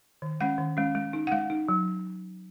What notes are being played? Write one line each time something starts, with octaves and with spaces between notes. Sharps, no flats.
D#3
G#3 C#4 F#5
D#3
G#3 C#4
G#3
D#4
F#5
G#3 F5
D#4
F#3